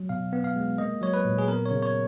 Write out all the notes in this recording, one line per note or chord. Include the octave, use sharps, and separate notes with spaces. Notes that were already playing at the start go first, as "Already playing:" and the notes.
Already playing: F#3
B2 F5
B3
F5
G#3
A#3 D#5
F#3 C#5
B4
A#2
G#4
B3 A#4
C#5
C#3
C#5